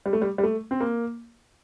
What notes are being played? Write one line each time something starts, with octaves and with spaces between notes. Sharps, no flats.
G3
A3
G3
G3
A3
C4
A#3